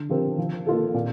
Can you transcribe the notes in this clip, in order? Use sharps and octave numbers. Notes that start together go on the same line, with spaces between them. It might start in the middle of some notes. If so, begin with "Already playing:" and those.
Already playing: D3
F3 C4 G4 A#4
F3
A#3 F4 A4
A#2